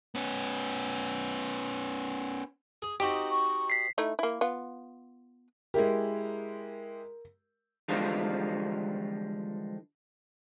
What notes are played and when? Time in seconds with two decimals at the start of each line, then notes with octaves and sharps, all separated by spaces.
0.15 B3 C#4
2.82 G#4
3.00 C4 D#4 F#4 G4
3.30 C#6
3.70 B6 C7
3.98 A3 D#4 E4
4.19 A#3 E4
4.41 B3 F4
5.74 G#3 E4 G4 A#4
7.88 D3 E3 F3 G3 G#3 F4